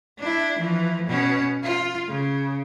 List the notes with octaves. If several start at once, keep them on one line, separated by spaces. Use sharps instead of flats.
D4 E4
E3 F3
B2 C#4
F4
C#3